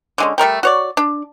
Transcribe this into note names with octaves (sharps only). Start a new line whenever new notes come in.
D3 G#3 C#4
G3 A3 A#4 G5
F#4 C#5 D5
D4